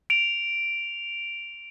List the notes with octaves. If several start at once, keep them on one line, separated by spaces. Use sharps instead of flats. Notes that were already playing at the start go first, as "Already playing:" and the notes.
D7 F7